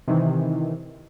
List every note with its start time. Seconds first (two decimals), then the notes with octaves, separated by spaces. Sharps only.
0.08 C3 D#3 E3